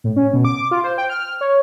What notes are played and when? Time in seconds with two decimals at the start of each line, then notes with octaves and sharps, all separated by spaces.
0.04 A2
0.16 C#4
0.33 B2
0.45 D6
0.57 D6
0.71 F4
0.84 C5
0.98 G5
1.10 F6
1.41 C#5